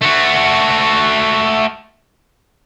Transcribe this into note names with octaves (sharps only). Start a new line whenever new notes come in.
A3 F#4